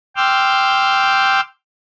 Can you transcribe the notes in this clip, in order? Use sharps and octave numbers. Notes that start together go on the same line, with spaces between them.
G5 C6 D6 E6 F6 G6